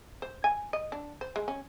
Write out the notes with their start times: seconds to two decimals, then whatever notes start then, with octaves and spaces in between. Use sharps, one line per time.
0.22 C5
0.44 G#5
0.73 D#5
0.92 D4
1.21 C5
1.36 G#3
1.48 C#4